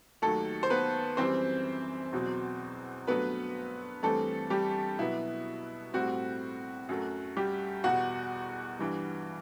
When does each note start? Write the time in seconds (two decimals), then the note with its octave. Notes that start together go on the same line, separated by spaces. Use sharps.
0.22 D#2 D#3 F#3 A3 A4
0.63 C5
0.70 B3 B4
1.17 F#2 E3 G3 C4 C5
2.12 E2 B2 F#3
3.07 G2 F#3 A3 B3 B4
4.03 G2 E3 G3 A3 C4 A4
4.50 G3 G4
4.98 B2 F#3 B3 E4
5.94 A2 G3 C4 F#4
6.89 F#2 F#3 A3
7.37 G3 G4
7.84 E2 B2 G3 F#4 F#5
8.79 G2 E3 G3